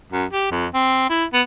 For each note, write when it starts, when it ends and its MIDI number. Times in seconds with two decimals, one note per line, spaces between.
0.12 0.25 42
0.32 0.48 67
0.51 0.66 41
0.74 1.06 60
1.10 1.25 64
1.33 1.42 59